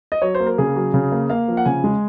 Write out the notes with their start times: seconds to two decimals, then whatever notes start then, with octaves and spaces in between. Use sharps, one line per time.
0.12 D#5
0.22 F#3 C#5
0.35 C5
0.40 A#3
0.47 A#4
0.58 C#3 G#4
0.76 F#3
0.94 C#3
1.12 A#3
1.30 A#3 F5
1.48 F3
1.57 F#5
1.66 C#3 G#5
1.84 G#3